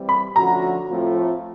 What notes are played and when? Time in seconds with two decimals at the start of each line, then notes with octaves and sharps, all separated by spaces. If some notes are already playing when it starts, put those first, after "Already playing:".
Already playing: E3 G3 C4
0.09 B5
0.35 D3 F3 A3 C#4 F#4 A#5
0.90 A2 F3 A3 C4 F4